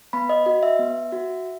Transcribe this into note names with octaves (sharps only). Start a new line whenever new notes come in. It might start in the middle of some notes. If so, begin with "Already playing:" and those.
B3 B5
D#5
F#4 D#5
E5
B3
F#4